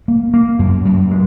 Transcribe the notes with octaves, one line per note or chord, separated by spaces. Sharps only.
A#3
A#3
F#2
F#2
G#3